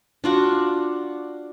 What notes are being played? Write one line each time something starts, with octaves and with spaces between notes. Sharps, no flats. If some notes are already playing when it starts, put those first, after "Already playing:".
D4 F4 F#4